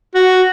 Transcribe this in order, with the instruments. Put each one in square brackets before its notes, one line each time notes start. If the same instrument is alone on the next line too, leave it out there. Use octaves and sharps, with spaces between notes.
[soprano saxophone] F#4